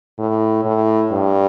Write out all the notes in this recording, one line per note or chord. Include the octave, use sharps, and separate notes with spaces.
A2
A2
G2